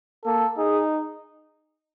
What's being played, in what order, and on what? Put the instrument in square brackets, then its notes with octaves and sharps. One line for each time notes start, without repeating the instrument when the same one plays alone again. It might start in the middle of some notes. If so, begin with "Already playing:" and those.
[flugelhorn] A#3 [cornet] A4
[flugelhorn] D#4 [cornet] G#4